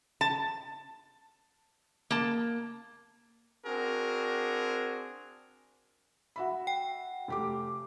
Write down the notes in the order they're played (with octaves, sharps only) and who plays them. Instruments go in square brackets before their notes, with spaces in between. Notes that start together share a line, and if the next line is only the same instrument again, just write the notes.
[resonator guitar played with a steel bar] A5
A#3 A5
[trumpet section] C4 D4 F#4 G#4 A#4
[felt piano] F#4 E5 B5
[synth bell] G5
[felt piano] F1 G4 D6